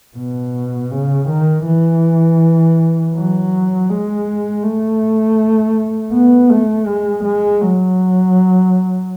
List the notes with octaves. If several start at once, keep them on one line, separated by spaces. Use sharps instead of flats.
B2
C#3
D#3
E3
F#3
G#3
A3
B3
A3
G#3
G#3
F#3